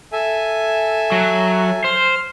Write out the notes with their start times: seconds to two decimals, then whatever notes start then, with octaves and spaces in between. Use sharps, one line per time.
0.12 A4 E5 G#5
1.12 F#3
1.84 C5 F6